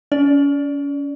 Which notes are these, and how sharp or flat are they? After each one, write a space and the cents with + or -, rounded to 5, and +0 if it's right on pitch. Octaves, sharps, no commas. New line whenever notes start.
C#4 +35 D5 +0